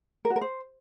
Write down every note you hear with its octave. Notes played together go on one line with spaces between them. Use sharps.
A#4
F#4
A#4
C5